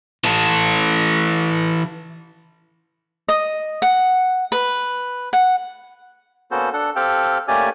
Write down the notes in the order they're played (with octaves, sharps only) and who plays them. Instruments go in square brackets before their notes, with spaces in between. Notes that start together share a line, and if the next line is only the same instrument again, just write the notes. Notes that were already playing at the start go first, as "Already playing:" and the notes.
[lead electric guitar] E3 A4
[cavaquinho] D#5
F#5
B4
F#5
[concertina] A#3 B3 C#4 F#4 A4 C5
D4 A4 F#5
C4 G4 A4 F5 G5
A3 A#3 C#4 G4 D5 G#5